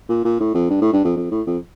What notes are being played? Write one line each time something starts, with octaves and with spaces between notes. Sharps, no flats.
A#2
A#2
A2
F2
G2
A2
G2
F2
F2
A2
F2